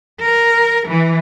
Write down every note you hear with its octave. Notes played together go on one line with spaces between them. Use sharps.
A#4
E3